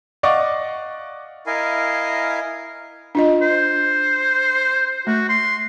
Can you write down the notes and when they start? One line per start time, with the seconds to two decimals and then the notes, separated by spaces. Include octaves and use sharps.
0.23 D5 D#5 F5 F#5 C#6 D6
1.47 E4 A#4 D#5 F5 G#5
3.15 D4 F4 D#5
3.41 C5
5.07 A3 F#4
5.29 C6